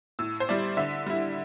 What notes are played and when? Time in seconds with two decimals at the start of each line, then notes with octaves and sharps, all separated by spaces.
0.19 A2 E6
0.40 C5
0.49 G3 E4 D5
0.77 D3 E5
1.06 G3 E4